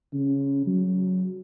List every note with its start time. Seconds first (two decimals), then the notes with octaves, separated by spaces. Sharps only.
0.13 C#3
0.67 F#3